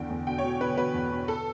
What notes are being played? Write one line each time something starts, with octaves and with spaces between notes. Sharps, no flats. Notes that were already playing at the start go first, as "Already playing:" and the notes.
Already playing: E2 D3 G5
E2
B2 G5
C#5
B2
B2 B4
B2 B4
E2
B2
A4